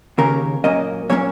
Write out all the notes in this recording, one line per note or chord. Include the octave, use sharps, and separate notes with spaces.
D#2 C#3 A#3 C#4 A#4
A#2 F#3 A#3 C#4 D#5
A#2 F#3 A#3 C#4 C#5